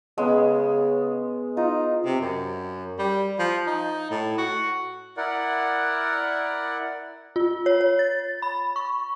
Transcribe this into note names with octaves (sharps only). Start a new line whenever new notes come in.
C#3 G#3 B3
D#4 F4
C3
F#2
G3
F3
D#4
A2
F#4
E4 A#4 D5 F#5
F4
C#5
C#5
A6
B5
C#6